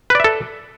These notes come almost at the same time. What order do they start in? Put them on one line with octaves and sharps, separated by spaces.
B4 D5 E5 A4